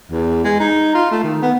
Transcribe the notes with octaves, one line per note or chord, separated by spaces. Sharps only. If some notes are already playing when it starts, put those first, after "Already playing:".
E2
G#3
D#4
F4
A3
D#3
B3